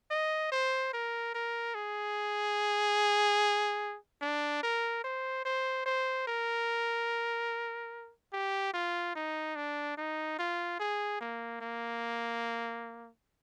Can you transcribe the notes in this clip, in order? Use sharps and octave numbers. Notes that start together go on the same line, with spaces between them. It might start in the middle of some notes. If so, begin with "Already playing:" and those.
D#5
C5
A#4
A#4
G#4
D4
A#4
C5
C5
C5
A#4
G4
F4
D#4
D4
D#4
F4
G#4
A#3
A#3